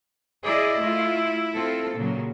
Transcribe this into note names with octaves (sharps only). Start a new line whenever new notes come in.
E4 G#4 D5 D#5
A3 F4
C4 F4 A4
A#2 C#3 F#3